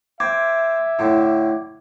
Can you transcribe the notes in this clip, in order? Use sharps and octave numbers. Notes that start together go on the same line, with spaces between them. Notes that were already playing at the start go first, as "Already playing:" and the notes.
C4 E5 D6 G#6
A2 D3